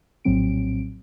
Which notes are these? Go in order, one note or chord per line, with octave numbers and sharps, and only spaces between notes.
A#1 A2 F#3 C4 D7